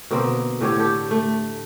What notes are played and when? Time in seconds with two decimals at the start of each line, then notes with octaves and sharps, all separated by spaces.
0.11 B2 D3 A#3 C4
0.61 A2 D3 G4 C#5
0.79 G4 A4
1.11 A3